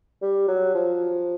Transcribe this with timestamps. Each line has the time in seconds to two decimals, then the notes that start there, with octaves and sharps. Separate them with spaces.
0.22 G3
0.48 F#3
0.75 F3